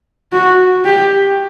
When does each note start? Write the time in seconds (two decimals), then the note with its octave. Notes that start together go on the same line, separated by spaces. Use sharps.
0.32 F#4
0.85 G4